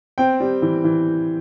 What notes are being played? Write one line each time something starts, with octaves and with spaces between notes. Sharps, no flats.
C4 G5
G3
E3
E3